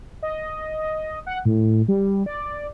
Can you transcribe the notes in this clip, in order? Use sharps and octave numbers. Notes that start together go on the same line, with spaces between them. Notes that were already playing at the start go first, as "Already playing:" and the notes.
D#5
F#5
A2
G3
D5